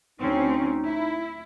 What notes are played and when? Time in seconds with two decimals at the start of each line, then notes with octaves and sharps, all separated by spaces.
0.20 D2 C4 C#4 D#4
0.86 E4